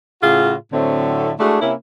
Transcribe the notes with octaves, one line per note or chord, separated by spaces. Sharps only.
A2 C#3 F4 F#4 G#4
A2 D3 F#3 A3 C4
G#3 A3 D4 E4 F#4 G#4
C3 A#3 C#4 E4